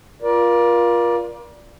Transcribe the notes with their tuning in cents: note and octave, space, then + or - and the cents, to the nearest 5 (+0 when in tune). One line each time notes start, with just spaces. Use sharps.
F4 +0 A#4 +35 D5 +0